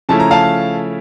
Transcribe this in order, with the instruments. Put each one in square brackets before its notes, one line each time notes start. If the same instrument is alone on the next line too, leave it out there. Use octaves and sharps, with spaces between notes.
[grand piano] C#3 F3 A3 C#4 E4 A5
A#5
F5 A5